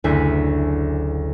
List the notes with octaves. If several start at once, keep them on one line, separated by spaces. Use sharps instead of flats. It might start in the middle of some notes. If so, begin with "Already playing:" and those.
F#1 D2 E4 G#5 B6 C7